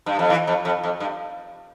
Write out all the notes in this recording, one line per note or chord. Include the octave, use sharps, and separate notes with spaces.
G2
F2
E3
F2
F2
F2
G2